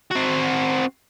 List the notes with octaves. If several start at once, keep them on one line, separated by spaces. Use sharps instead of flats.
C4 F#4